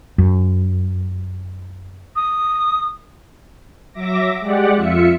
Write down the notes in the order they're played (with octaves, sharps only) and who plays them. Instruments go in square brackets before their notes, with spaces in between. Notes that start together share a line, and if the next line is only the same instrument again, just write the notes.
[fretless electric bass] F#2
[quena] D#6
[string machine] F#3 E5 D6 A#6
G#3 G4 D5 F#5
F2 F4 E5 C#7